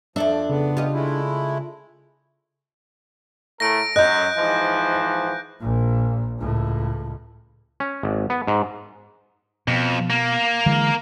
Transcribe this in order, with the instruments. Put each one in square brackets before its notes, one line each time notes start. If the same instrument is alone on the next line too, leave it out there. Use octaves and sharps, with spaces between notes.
[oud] F2 A4 E5 [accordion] F3 [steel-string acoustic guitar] D4
[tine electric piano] C#3 [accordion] B3
[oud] F4 G4 D#5
[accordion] G#3 A3 E4
[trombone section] A2 A3 A#4 [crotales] A#6 D7
[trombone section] F#2 [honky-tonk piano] D#5 [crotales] F#6 G6
[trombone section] G#2 E3 F3
[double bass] A#1 A#2
C#2 A2
[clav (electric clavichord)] C#4
G#1
B3
G#2
[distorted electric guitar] F2 [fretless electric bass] B2
[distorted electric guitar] A#3
[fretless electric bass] D3 E3 G#3